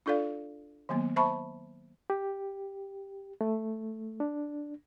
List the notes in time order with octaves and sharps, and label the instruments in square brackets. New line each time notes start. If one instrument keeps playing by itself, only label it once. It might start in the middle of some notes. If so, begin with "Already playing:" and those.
[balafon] D4 F4 A4 D5 F5
D#3 F#3 A#3 B3
C5 E5 A5 B5 C#6
[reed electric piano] G4
A3
D4